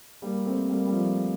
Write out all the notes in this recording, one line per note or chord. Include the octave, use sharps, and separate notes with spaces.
G3 A#3
A3 C4
G3 A#3
G3
F3 A3